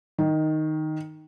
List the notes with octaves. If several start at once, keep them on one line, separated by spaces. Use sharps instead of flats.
D#3